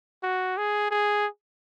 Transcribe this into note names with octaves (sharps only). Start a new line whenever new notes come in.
F#4
G#4
G#4